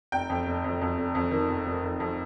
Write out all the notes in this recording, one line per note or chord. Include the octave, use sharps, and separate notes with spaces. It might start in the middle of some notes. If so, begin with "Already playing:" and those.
F1 G5
F2
F1
F2
F2
F1
F2
D#3
F1
F1
F2
F2